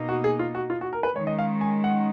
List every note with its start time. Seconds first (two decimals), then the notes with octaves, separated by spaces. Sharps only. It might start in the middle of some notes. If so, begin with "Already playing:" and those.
Already playing: B2 A#3 D#4
0.09 F#4
0.24 G#4
0.39 F4
0.55 F#4
0.70 F4
0.81 F#4
0.93 A#4
1.03 B4
1.16 D#3 G#3 C#4 C#5
1.27 D#5
1.39 F5
1.61 G#5
1.84 F#5